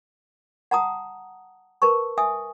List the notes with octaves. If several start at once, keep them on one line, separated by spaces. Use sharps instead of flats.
F#5 A5 A#5 D#6
A#4 B4 A5 C#6
E5 G#5 D#6